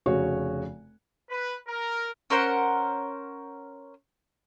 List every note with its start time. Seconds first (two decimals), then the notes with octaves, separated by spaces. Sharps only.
0.06 F1 C#3 F#4 C#5
1.29 B4
1.67 A#4
2.30 C#4 A#4 C5 F#5